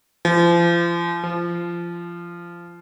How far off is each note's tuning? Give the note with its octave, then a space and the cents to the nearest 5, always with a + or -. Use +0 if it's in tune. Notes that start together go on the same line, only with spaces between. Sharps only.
F3 -35
F3 -20